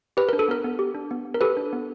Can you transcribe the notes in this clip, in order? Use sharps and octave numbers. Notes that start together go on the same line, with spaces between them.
G4 B4
D4 A#4
A4
B3 A#4
B3
G4
D4
B3
B3
A#4
G4 A4 B4
D4
B3